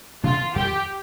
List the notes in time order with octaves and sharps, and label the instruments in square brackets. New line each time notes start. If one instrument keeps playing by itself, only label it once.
[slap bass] C3 D#3 A#3 D4 [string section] F4
[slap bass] F2 D#3 G3 [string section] G4